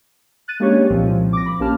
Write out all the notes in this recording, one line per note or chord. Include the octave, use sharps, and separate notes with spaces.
F#6 A6 D#7
G#3 A#3 C#4 D4 G4 C#5
C2 A#2 F3 C4
D6 A#6
B5
A#1 A#3 C#4 G4 A5 F6